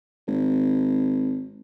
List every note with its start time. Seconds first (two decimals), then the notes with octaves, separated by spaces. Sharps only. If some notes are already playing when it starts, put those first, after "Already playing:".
0.28 G#1